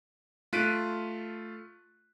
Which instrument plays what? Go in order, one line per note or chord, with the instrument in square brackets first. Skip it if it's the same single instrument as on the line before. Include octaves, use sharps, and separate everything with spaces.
[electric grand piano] A3 F4 F#6 B6 D7 D#7